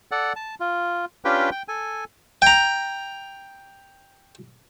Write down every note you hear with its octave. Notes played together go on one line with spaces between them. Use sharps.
A4 D5 F#5
A5
F4
C#4 D4 F4 G4 B4 G5
G5
A4 G#5
G5 A#5